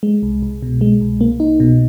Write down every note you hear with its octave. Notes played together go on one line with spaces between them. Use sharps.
G#3
C2
C2
B2
G#3
C2
A#3
D#4
B2